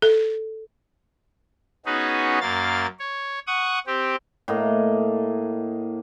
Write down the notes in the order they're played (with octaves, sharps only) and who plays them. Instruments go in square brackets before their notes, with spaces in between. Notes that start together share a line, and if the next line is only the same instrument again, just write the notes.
[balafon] A4
[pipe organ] B3 C#4 D#4 F#4 G#4 B4
F#2 A#3 F5 A6
C#5
F#5 C#6 D#6
C4 G4
[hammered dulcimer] A2 A#3 D#5